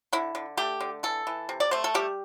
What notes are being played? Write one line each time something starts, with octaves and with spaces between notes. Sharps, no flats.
D3 E4
D3
A3 G4
D3
E3 A4
E3
C3
D5
A3 C5
A4
G3 G4